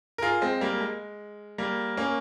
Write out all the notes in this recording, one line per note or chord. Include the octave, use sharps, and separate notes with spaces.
A#4
F4 G#4
G#3 C4
G3 A#3
G#3
G3 A#3
A#3 C#4